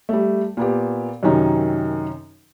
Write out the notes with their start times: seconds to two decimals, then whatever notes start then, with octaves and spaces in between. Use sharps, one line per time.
0.09 G3 A3
0.57 A#2 B3 G4
1.23 F#2 C3 D#3 C#4 D#4